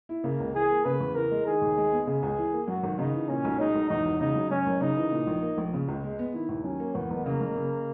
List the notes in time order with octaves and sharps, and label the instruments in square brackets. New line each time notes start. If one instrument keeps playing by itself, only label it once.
[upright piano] E4
[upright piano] C#3 [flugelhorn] A#3
[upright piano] C#2
[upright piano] E3 [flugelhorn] G#4
[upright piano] A#3
[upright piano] C#3 [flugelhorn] B4
[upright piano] E2
[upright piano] E3 [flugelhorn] A#4
[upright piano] G#3
[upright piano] D#3 [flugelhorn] G#4
[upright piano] D#2
G#3
B3
[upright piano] C#3 [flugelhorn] G#4
[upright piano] C#2
E3
A#3
[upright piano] F#2 [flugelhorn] F#4
[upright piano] G#1
[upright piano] C#3 [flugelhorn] D#4
[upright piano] E3
[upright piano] A#2 [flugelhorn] C#4
[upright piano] B1
[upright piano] G#3 [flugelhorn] D#4
[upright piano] B1
[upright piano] E2 [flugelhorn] D#4
[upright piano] E1
[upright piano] C#3 [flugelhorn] D#4
[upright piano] F#3
[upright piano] F#2 [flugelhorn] C#4
[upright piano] F#1
[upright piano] C#3 [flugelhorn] D#4
[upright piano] E3
A#2
A#1
A#3
A#1
C#3
C#2
G#3
B3
[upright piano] D#3 [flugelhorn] E4
[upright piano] D#2
[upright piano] F#3 [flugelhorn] C#4
[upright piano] A#3
[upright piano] E2 [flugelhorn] B3
[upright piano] F#1
[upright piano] C#3 [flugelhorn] A#3
[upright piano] F#1
C#3